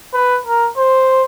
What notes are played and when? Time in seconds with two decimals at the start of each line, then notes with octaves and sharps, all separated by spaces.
0.14 B4
0.46 A#4
0.78 C5